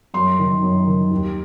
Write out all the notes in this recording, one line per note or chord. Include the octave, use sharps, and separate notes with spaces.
F#2 C6
D#3
F#2
D#3
D#2